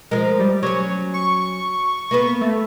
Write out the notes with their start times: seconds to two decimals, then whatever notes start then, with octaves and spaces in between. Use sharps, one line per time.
0.11 F3 G#3 A#4
0.39 G3
0.63 F#3 C#4 C#5
1.14 C#6
2.11 A#3 B3 B4
2.41 A3